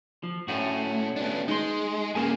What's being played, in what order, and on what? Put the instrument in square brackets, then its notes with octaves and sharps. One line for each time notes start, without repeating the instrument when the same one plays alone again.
[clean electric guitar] F3
[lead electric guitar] A2 [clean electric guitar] A3 C#4 F#4
[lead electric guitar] B3 D4
[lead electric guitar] G#3 [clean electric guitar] D#4 C6
[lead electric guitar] G2 A#3 [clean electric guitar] C#4 G#4 G#5